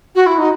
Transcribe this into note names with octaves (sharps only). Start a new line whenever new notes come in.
F#4
E4
D#4